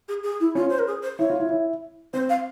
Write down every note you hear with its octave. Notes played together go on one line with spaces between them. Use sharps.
G#4
G#4
E4
C#4 F4
C5
A#4
G#4
C5
E4 C#5
F4
E4
E4
C4 C5
F5